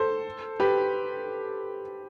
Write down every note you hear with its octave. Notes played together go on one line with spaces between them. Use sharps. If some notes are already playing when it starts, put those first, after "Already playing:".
Already playing: A4 C5
G4 B4